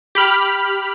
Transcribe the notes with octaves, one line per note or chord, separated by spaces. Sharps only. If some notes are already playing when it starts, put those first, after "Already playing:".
G4 B5 F6